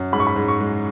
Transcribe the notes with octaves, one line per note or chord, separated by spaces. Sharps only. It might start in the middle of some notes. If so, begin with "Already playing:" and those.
Already playing: F#2
G#2 B5
C#6
B5
G#2
C#6
G#3